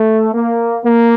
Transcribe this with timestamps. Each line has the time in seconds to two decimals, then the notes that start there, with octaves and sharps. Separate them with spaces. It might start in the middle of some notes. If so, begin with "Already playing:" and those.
Already playing: A3
0.34 A#3
0.85 A#3